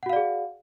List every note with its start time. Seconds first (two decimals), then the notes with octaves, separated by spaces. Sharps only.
0.03 F#5
0.06 F#4
0.09 F5
0.13 D5
0.16 G#4